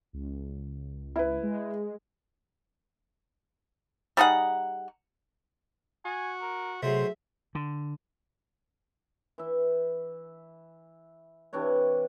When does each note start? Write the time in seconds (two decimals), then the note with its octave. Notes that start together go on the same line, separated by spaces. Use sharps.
0.13 C#2
1.16 E4 B4
1.43 G#3
4.17 G3 D#4 G#4 F#5
6.05 F#4 G#5
6.42 A#4
6.83 C3 F#3 G#3 A3 C5 E5
7.55 D3
9.38 E3 E5
11.53 C3 E3 D4 C#5